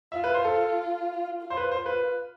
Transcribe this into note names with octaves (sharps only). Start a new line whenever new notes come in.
F4 E5
B4
C5
A4
F4
C5
B4
C5
B4